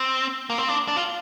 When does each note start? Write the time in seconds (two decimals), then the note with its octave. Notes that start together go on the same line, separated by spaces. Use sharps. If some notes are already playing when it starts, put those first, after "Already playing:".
Already playing: C4
0.50 A#3
0.58 C4
0.69 D4
0.88 D4
0.96 F4